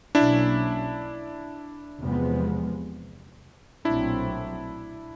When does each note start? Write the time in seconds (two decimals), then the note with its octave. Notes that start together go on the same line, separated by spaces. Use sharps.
0.15 B1 B2 F#3 A#3 C#4 D4 E4
2.00 E2 C3 F3 G#3 B3
3.85 B1 A#2 F#3 A3 C4 D4 E4